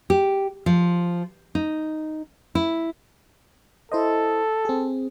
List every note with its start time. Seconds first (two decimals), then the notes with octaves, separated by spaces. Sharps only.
0.10 G4
0.66 F3
1.55 D#4
2.55 E4
3.92 E4 A4 C5 D#5
4.65 C4 G#4